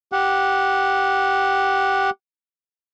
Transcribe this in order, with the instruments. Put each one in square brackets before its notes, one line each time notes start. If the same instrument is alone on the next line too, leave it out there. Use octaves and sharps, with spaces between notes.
[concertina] G4 F#5